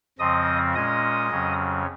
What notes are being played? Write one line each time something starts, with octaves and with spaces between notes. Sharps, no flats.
F2 C#3 F3 C4 D#5 D#6
A#2 G#3 C#4 D#5 D#6
F2 C#3 F#3 C#4